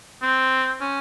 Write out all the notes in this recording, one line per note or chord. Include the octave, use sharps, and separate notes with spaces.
C4
C#4